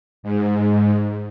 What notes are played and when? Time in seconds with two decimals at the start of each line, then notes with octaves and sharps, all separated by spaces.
0.23 G#2